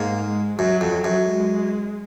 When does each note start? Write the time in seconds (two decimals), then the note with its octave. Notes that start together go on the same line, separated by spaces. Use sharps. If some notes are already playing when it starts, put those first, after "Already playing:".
Already playing: G#2 A#3
0.25 G#3
0.59 F#2 F#3
0.81 F2
1.04 F#2
1.26 G#3